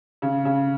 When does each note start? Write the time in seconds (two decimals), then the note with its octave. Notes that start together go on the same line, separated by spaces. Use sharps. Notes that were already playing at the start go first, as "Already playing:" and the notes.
0.22 C#3
0.45 C#3